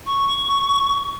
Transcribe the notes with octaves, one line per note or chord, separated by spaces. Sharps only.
C#6